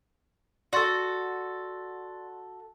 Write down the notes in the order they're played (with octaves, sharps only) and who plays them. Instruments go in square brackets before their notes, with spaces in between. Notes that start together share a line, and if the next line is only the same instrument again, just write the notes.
[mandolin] F#4 A4 [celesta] D5 C6 A6